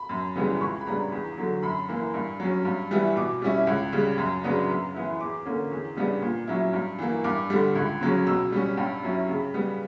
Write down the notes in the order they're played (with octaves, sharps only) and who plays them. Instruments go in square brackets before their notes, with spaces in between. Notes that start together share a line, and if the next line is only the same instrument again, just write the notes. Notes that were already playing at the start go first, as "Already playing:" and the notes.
Already playing: [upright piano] B5
F#2
C#3 E3 G3 B3
C#2 C#6
B5
C#3 G3 B3 D4 A#5
E2
D3 F#3
F#2 B5
E3 A#3
G2
F#3 C#4
G2
E3 G3 B3 E4
B2 D6
G3 C#4 E4
C#2
C#3 G3
F#2
C#3 F#3 B3 D4
F#2
E3 B3 E4
E2 D6
D3 A#3 C#4
E2
C#3 G3 B3 D4
A#2
F#3 C#4 E4
G2
E3 A#3
G2 D6
D3 G3
C#2
C#3 F#3 C#4
B2 E6
G3 C#4
G2 G5
F#3 C#4 E4
C#3
G3 B3